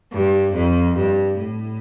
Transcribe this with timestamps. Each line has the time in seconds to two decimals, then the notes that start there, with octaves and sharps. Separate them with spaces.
0.12 G2
0.54 F2
0.96 G2
1.38 A2